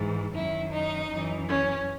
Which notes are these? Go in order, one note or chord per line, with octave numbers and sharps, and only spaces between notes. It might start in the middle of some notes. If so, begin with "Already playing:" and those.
Already playing: G#2 E3
F#2 D#3 E4
D#4
F#2 E3
C#4